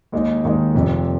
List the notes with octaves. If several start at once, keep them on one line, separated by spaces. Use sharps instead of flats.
D#2 D#3 G#3 D#4
D#2 D#3 G#3 D#4
F1 F2 C3